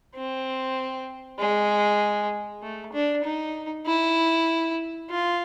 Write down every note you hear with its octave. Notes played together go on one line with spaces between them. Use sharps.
C4
G#3
A3
D4
D#4
E4
F4